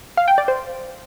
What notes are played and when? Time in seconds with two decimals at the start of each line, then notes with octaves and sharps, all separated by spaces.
0.17 F5
0.28 G5
0.38 D5
0.48 C5